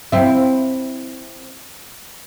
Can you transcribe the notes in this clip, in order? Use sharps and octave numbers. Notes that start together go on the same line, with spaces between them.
C4 E4